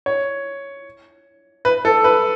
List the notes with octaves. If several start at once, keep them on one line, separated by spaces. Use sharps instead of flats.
C#5
B4
A4
B4